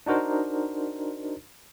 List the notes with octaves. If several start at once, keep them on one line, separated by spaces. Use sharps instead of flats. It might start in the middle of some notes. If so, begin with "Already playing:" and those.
D4 D#4 F#4 A#4 C5